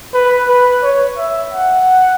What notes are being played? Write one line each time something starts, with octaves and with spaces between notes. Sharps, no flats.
B4
B4
C#5
E5
F#5